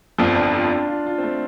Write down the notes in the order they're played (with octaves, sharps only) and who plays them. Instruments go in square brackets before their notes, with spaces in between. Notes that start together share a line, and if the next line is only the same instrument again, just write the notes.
[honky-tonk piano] G1 F2 F3 [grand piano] D4
[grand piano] D4
F4
D4
F4
F4
C4
A3